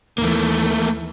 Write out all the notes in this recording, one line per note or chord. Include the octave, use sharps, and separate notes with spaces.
D#2 E3 A3 A#3